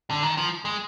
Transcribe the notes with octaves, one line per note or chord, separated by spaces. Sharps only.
D3
D#3
F3
G#3